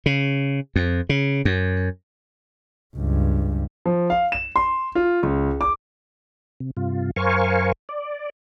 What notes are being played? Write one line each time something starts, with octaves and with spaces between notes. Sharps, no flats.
C#3
F2
C#3
F#2
C#2 G2
F3
F5
E7
C6
F4
C#2
D6
C3
G2 C3 F4
F#2 A#4 C5 F5 G#5 C#6
D5